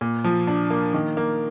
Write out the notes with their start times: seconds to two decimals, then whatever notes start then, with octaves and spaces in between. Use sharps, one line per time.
0.01 A#2
0.24 F3
0.47 D4
0.70 A#3
0.94 D#3
1.17 A#3